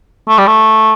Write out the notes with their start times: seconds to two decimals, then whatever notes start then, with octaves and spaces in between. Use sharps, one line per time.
0.29 A3
0.38 G3
0.47 A3